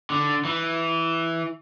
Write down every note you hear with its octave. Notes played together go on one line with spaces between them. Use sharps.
D3
E3